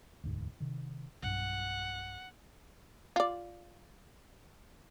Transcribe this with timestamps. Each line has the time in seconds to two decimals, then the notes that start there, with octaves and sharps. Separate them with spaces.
0.24 E1 D2 G#2
0.60 C3 D#3
1.23 B1 G2 F#5
3.16 F4 D5